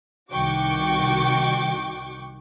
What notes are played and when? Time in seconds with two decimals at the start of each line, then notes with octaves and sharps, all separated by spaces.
0.31 C2 D#3 F#4 G5 C#6 D6